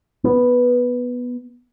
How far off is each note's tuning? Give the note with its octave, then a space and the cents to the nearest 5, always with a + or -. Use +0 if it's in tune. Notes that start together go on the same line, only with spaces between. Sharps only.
B3 -5